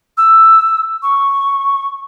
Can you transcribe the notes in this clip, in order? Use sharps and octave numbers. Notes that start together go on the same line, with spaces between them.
E6
C#6